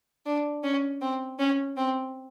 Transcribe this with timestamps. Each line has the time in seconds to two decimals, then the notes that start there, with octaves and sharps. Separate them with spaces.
0.25 D4
0.63 C#4
1.01 C4
1.39 C#4
1.77 C4